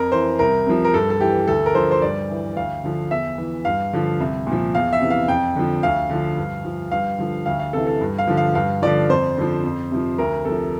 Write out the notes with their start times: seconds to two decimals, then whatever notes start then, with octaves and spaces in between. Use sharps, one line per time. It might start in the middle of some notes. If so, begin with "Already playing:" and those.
Already playing: F2 A#4
0.12 E3 C5
0.39 C2 A#4
0.66 C3 F3
0.85 A#4
0.94 G2 A4
1.10 A4
1.21 E3 G4
1.48 D2 A4
1.66 A#4
1.75 D3 F3 C5
1.91 C5
2.02 G2 D5
2.30 E3
2.56 D2 F5
2.84 D3 F3
3.11 E2 E5
3.38 E3
3.65 G2 F5
3.93 D3 F3
4.20 C2
4.47 A#2 F3
4.75 E2 F5
4.93 E5
5.01 C3 E3
5.10 F5
5.28 F2 G5
5.56 D3 F3
5.83 D2 F5
6.10 D3 F3
6.37 G2
6.65 F3
6.91 G2 F5
7.18 D3 F3
7.46 D2 F5
7.60 F5
7.73 C3 E3 A4
7.87 A4
8.01 G2
8.18 F5
8.28 D3 F3
8.37 F5
8.55 G2 F5
8.82 D3 F3 D5
9.09 F2 C5
9.37 D3 F3
9.63 F2
9.91 C3 F3
10.18 D2 A#4
10.45 C3 F3 A4